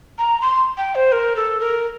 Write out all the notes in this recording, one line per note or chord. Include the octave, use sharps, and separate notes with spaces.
A#5
C6
G5
C5
A#4
A4
A#4